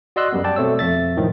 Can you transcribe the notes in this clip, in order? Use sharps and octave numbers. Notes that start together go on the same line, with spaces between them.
F#4 D5 D#5 C6 E6 F#6
F#2 G3 B3
D5 G5 A5
B2 A3 C4 C#5 E6
F2 E5 A6
C2 A2 D#3 F3